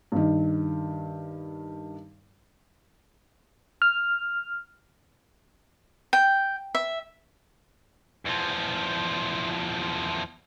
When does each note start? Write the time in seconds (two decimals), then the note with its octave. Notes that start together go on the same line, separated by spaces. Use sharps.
0.12 G2 D#3
3.82 F6
6.13 G5
6.75 E5
8.26 E2 F3